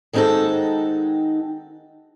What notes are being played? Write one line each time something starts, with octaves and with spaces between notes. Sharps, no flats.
D#3 G#3 C4 D#4 F#4 A4